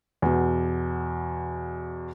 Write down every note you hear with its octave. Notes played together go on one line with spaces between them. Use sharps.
E2 B2